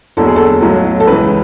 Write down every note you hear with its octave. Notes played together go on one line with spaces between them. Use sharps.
F#1 E2 D3 F#3 A4
G#4
A4
B1 A2 F#3
A4
C#2 C#3 E3 B4